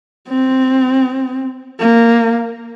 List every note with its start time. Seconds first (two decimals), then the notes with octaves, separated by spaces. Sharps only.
0.29 C4
1.79 A#3